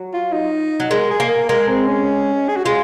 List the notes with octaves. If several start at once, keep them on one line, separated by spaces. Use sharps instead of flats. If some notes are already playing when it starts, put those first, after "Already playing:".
Already playing: F#3
F4
D#4
F#3
G#3 A#4
G#4
A#3
A#4
G#3 A#4
C4
C#4
G#4
F#4
G#3 F4